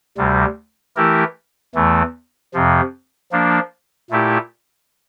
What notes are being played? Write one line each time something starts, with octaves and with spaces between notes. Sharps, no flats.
D2 C3 G3
E3 A3 E4 G4 A#4
E2 E3 A3
F2 C3 F3
F3 A#3 D4
A#2 A3 E4 G4